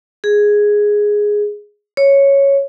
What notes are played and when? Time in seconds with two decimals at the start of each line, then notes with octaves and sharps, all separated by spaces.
0.24 G#4
1.97 C#5